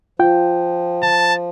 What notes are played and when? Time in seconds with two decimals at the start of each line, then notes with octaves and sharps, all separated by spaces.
0.19 F3 F4 G5
1.03 A5